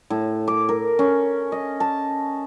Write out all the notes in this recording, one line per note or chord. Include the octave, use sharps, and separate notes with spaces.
A2
D6
A#4
C#4
D#5
A5